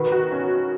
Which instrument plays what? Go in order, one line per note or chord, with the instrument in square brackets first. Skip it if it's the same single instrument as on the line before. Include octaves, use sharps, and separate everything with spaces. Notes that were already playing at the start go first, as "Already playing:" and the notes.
Already playing: [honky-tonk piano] B2 D#3 [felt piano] B4
[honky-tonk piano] F#4
C#4